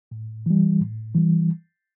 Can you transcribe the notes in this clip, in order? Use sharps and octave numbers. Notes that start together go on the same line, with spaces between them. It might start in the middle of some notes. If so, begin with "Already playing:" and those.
A2
E3 G3
A2
E3 G3